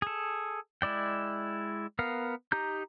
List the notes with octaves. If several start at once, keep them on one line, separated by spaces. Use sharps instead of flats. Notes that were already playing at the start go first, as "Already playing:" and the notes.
G#4 A4
G#3 E4 D5 G5
B3 A#4 F5
D#4 G4 A#5 G6